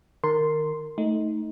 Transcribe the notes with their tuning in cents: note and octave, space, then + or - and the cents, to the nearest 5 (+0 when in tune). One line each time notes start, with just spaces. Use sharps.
D#3 -15 A#4 -15 C6 +0
A3 +0 D#4 +15